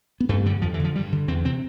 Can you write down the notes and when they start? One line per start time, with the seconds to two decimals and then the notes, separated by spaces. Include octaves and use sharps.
0.20 B3
0.29 G2 A3
0.45 D3 G3
0.62 F2 F3
0.74 E3
0.80 D3 F3
0.95 G2 G3
1.12 D3
1.28 E2 C4
1.44 C3 C4